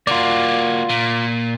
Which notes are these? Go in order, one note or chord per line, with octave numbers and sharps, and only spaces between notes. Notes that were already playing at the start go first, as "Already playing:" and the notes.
A#3 F4 F#4 D5
A#2